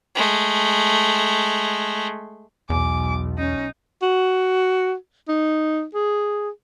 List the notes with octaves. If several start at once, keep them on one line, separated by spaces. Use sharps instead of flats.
G#3 A3
B1 E2 G#5 D6
C#4 D#4
F#4
D#4
G#4